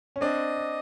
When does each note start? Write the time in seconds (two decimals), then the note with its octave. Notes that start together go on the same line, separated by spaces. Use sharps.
0.16 C#4
0.21 C4 D4 D#5